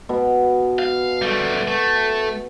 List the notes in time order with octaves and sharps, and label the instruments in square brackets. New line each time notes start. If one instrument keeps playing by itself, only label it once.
[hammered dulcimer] B2
[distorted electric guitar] F5
G3 A3
A3